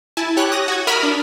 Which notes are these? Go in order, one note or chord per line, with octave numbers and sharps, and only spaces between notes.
E4 G#5 A5
G4 C#5 F#6
D#6 A#6
F#4 G#6
A#4 E5 B5 D#6 F6
D4